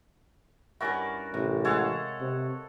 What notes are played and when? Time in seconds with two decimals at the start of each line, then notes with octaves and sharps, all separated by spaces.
0.80 G2 C#4 E4 F#4 A#4 D5
1.34 A1 C3
1.65 G#3 A4 C#5 F5 F#5
2.21 C3